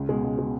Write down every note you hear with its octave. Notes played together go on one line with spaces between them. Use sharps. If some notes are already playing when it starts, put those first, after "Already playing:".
Already playing: C#2
B2 G#3
C#2
B2 G#3